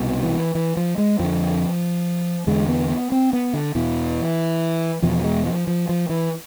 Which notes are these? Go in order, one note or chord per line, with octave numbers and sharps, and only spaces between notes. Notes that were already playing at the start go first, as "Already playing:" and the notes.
Already playing: C2 B2
E3
E3
F3
G#3
F2 D3 F3
E2 D3 G#3
B3
B3
C4
B3
D3
E2 B2 E3
E2 B2 F3
G#3
F3
F3
F3
E3